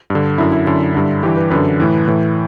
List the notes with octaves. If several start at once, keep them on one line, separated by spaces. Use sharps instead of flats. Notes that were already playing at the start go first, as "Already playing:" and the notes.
G2
D3
F#2 D3 E4
E4
F#2 D3 E4
G2 D3
G2 E3 G4
B4
F#2 D3 B4
A2 E3
A2 E3